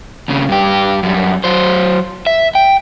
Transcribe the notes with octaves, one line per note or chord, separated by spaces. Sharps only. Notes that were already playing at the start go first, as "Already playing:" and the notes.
D#2 C#3
G2 G4
F#2 G3
F#3 C5
E5
G5